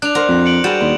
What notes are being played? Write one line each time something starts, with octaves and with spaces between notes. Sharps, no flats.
D4 F#6 F7
A#4 C5 F#5
F2 F#6
C#7 D7 F#7
G3 F#4 G#4 B4 G6 E7
D#2 C6